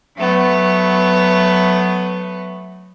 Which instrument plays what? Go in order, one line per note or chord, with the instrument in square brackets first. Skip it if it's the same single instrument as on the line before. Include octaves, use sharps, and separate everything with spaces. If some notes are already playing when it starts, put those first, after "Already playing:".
[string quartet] F#3 A3 B3